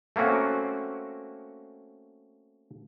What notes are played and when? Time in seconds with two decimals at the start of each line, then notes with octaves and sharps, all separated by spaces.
0.16 A3 A#3 C4 C#4 F#4